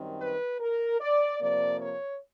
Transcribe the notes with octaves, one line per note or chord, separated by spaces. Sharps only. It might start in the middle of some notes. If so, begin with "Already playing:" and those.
Already playing: F#2 D#3 G3 C4
B4
A#4
D5
F2 C3 F3 A#3 D5
C#5